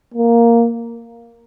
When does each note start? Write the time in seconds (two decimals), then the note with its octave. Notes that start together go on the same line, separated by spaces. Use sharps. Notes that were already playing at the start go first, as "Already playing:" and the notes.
0.14 A#3